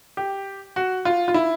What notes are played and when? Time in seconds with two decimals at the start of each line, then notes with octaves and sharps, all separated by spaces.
0.17 G4
0.76 F#4
1.05 F4
1.28 F4
1.34 E4